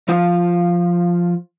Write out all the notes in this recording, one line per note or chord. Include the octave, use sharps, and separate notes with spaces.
F3 F4 F5